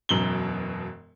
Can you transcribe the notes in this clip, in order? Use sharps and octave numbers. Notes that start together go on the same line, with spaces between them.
E1 F#2 B2 F#7 G7